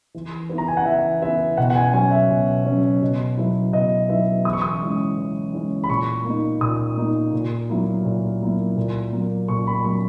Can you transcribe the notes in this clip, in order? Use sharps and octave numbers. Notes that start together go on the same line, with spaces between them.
E3
B3 E4
A#5
G#5
F#5
E3 E5
B3 E4 E5
B2 F#5
F#5
G#5
F#3 C#4 G#5
E5
B2
F#3 C#4
B2
F#3 B3 E4
B2 D#5
F#3 B3 E4 E5
E3 D#6
C#6
D#6
G#3 C#4 E4
E3
G#3 C#4 E4
B5
A#2 C#6
A#3 D#4
A#2 D#6
A#3 D#4
A#2
F#3 A#3 E4
A#2
F#3 A#3 E4
A#2
F#3 A#3
A#2 C#6
B5
F#3 A#3 C#6